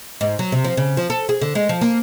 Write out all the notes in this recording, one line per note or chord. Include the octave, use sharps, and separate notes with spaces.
G#2
F#3
C3
F3
C#3
F3
A4
G#4
D3
G#3
F3
A#3